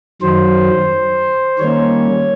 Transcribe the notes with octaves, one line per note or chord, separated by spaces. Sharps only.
F#2 D#3 F#3 C5
D#3 G3 A#3 C#4 C#5